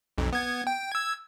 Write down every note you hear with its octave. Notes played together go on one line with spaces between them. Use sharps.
B1 F2
B3 G#6
G5
E6 G#6